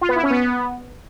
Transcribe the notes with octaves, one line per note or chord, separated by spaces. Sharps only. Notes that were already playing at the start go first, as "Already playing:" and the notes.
F4
B3
E4
C#4
B3